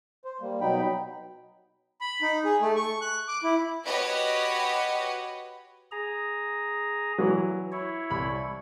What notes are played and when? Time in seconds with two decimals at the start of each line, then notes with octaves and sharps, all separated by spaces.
0.25 C5
0.41 G3 A#3
0.61 B2 F#3 D#4 G5 B5
2.01 B5
2.22 D#4
2.45 G#4
2.61 A3
2.76 C#6
3.02 F#6
3.28 D6
3.44 E4
3.85 F#4 G4 B4 C#5 D#5
5.91 G#4 A#5
7.18 E3 F#3
7.72 E4 C#5
8.10 C2 B5